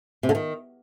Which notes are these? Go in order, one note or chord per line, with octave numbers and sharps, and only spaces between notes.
C3
D3
D#3